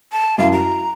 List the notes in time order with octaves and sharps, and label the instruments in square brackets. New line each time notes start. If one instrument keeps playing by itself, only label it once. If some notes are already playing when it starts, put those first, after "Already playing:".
[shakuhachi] A5
[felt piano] F#2 E4 [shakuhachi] F5
[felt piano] F#4 [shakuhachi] A#5